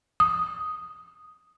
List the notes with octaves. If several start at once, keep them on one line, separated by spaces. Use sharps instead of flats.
D#6